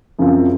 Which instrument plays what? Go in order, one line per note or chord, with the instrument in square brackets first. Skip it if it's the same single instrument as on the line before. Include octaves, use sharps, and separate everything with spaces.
[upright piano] F#2 C#3 F3 C4 F4